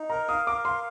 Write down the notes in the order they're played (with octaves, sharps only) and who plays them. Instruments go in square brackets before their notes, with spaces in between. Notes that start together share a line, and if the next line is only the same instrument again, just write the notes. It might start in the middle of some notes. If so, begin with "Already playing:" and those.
Already playing: [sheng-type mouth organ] D#4
[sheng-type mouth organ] A#4 [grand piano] A#5
[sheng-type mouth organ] F5 [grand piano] D#6
[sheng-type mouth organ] A#4 [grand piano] D6
[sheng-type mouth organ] F5 [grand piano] C6